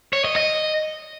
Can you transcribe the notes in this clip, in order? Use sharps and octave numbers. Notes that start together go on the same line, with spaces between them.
C#5
D#5
D#5